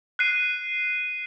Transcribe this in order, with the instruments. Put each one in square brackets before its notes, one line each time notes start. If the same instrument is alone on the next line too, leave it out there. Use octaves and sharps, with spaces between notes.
[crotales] F#6 C7 D#7